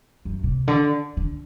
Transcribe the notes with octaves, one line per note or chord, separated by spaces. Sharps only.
F#2
C3
D3
D3